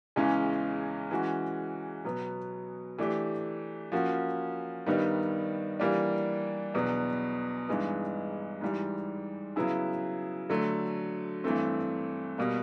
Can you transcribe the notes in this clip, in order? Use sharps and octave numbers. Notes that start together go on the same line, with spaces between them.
E2 C#3 E3 G#3 C#4
E3 G#3 C#4 F#4
B2 F#3 B3
E3 A3 D4 G4
F3 A#3 C#4 F#4
G2 D#3 G3 B3 D#4
E3 G3 A#3 D4
E2 B2 F#3 B3 D4
G2 E3 G#3 B3 D#4
G#2 E3 G3
C#3 F#3 B3 E4 G#4
D3 F#3 A3
G2 E3 A3 C4
B2 G3 A#3